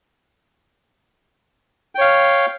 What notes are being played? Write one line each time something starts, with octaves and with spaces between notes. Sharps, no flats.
C#5 F5 G5